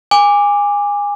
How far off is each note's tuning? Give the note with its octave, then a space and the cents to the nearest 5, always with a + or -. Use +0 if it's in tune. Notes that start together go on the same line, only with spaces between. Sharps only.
G#5 -25 D6 +0